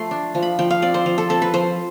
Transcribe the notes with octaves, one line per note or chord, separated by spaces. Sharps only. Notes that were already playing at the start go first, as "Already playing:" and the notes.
Already playing: F3 A3 C6
D4
F3
B5
F3 G5
F5
C4 D5
C5
F3
A4
C4 A4
B4
F3 C5